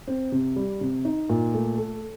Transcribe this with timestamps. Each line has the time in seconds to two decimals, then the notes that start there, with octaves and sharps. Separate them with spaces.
0.07 C4
0.32 C3
0.56 G3
0.81 C3
1.05 D#4
1.30 A#2
1.54 A3
1.78 A4